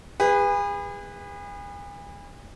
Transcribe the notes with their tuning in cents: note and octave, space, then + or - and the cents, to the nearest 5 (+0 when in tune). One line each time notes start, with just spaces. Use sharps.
G#4 -40 B4 +0